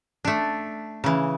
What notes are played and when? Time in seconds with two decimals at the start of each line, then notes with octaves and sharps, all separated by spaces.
0.25 A3 D4
1.04 C#3 E3